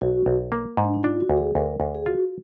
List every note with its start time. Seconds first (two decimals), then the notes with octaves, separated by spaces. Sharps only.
0.01 B1 F#4
0.26 B1
0.52 A#3
0.77 G#2
0.84 D4
0.94 D#4
1.03 D4 F4
1.20 F#4
1.29 D2
1.37 G#4
1.55 D2 A#4
1.80 D2
1.95 G#4
2.06 F4 F#4